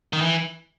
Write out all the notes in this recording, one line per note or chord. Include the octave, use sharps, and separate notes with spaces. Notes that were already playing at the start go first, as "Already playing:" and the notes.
D#3
E3